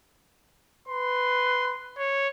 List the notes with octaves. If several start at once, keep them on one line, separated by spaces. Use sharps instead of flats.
B4 C6
C#5